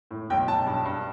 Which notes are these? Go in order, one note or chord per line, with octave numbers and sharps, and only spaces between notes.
A2
B1 G5
B1 A5
G2
G2